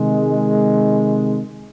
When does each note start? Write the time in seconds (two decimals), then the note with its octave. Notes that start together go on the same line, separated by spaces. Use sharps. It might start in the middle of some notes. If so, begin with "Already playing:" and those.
Already playing: C3 D#3 G#3